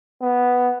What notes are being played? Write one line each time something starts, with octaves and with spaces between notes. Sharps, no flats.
B3